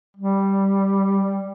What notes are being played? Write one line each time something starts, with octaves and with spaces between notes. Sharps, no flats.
G3